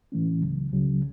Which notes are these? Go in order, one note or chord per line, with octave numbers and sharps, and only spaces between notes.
A2 E3 A3 C#4
C#2 C#3 F#3
C#2 C#3 F#3